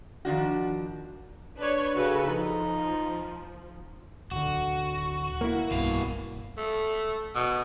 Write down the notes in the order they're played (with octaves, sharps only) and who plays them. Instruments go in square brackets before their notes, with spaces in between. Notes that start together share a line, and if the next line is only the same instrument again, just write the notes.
[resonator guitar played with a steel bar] D#3 F3 D4 F#4
[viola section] D4 B4 C#5
[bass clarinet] C#3 [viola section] F#4 A4 B4
[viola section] F3 [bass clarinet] D#4
[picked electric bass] D1 D3 [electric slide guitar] F#4
[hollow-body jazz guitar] A#3 E4
[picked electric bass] B1 G2 [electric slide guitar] B2 F5
[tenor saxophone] A3
B2